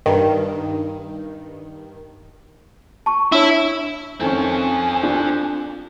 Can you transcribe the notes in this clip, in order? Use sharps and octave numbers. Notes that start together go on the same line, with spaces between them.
G2 D#3
A5 C#6
D4 E4 C#5 E6
F2 D#3 C4 C#4 A4 G#5
D4 F4